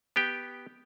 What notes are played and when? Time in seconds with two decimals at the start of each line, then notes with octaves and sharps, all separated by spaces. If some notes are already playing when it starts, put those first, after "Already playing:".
0.16 B3 G4 G5